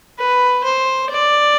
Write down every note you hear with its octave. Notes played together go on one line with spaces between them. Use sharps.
B4
C5
D5